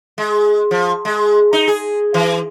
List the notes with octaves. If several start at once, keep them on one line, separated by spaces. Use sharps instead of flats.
G#3
F3
G#3
D#4
G#4
E3